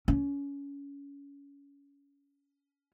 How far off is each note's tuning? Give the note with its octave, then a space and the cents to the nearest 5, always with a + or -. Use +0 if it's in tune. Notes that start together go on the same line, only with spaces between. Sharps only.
C#4 +25